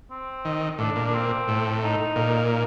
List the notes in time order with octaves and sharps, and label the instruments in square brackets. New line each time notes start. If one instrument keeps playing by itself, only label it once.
[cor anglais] C4
[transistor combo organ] D#3
[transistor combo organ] A2 [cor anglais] D4
[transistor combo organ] A#2
[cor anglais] D4
C4
[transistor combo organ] A2
[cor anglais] D#4
[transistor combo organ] A#2
[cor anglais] D#4